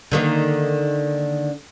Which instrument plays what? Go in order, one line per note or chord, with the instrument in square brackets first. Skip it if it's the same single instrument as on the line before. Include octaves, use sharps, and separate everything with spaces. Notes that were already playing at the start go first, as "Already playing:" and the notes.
[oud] D3 D#3 A#3